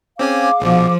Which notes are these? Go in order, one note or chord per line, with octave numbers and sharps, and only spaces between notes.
C4 C#4 G#4 F5 G#5 D6
A#1 B2 F3